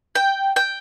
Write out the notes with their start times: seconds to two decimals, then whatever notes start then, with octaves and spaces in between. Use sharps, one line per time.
0.15 G5
0.56 G5